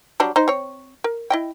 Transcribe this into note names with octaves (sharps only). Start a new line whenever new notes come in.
F#3 G3 D4
D#4 C5
C4 C#5
A#4
E4 D#5 G5